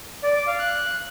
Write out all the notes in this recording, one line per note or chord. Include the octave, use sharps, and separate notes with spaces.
D5
D6
F5
F#6